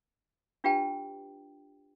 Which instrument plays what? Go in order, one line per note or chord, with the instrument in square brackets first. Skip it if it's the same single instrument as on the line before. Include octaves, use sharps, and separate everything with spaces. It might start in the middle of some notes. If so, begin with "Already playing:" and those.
[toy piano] D4 F4 G4 B4 G5 A5